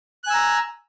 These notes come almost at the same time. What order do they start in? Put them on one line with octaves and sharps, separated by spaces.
F#6 G#5 E6 A#5